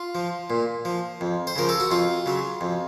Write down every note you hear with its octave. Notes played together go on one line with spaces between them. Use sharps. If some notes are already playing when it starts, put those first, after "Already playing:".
Already playing: F4
F3
A#2
F3
F2
C5
C#3 F3 A#4
A4
F#4
F2 F4
C#3 F#3
F2